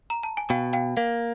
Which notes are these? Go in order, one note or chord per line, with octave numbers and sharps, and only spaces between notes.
A#5
A5
G#5
B2 F5 G5
F5 G5
A#3 F5